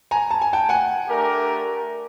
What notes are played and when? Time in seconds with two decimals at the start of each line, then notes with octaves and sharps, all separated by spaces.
0.11 G#5 A#5
0.31 A5
0.42 G#5
0.53 G5 A5
0.69 F#5 G#5
1.08 A3 D4 G4 A#4